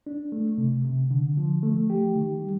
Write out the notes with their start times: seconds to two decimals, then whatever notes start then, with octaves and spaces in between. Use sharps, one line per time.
0.07 D4
0.32 A3
0.58 C3
0.85 C3
1.11 D3
1.37 F3
1.63 A3
1.90 G4
2.16 D#3
2.42 G3